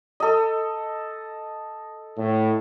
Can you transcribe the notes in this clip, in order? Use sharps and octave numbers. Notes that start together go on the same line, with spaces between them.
A4 D#5
A2